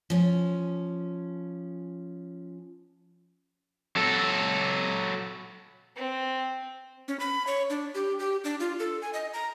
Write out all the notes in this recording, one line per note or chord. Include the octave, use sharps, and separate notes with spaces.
F3 C#4
F#3 A4
C4
C#4
B5
C#5
D4
G4
G4
D4
F4
A4
G#5
D#5
A#5